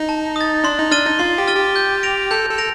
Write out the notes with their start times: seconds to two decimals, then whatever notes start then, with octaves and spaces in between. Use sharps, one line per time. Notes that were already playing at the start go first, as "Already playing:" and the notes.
Already playing: D#4
0.09 A5
0.36 D#6 A6
0.64 D4 C6
0.78 D#4
0.91 D4 F6 A6 D#7 G7
1.06 D#4
1.19 F4 C6
1.38 G4
1.48 F6 A6 D#7 G7
1.56 G4
1.76 G6
2.03 A#6 D7 F7
2.31 A4 G6
2.50 A4
2.58 A#6 D7 F7